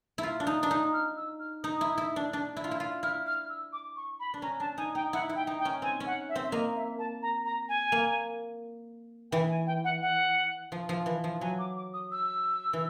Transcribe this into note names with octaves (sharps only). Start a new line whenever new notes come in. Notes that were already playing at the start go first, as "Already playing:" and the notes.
E4
F4
D4
D#4
D4
D#4
F6
E6
F6
D#4 D#6
E4
E4
D4
D4
E4
F4
E4
F4
E4 F6
F6
E6
D6
C#6
B5
D4
C#4 A#5
D4 A5
D#4 G#5
D#4 G5
E4 F#5
E4
G5
D#4
G5
C#4
C4 G#5
C#4
F#5
E5
C4
E5
A#3 D#5
E5
A5
A#5
A#5
G#5
A#3
E3 G5
G#5
G5
F#5
F#5
F3
F3
E3
F3
F#3 G#5
D6
D6
D#6
E6
E3